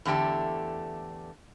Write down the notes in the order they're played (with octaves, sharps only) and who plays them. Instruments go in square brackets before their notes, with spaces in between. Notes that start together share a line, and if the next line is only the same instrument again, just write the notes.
[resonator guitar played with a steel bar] E2 D3 A3 G4 A4